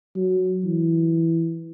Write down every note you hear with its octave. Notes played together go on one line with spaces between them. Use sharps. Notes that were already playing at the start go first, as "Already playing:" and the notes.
F#3
E3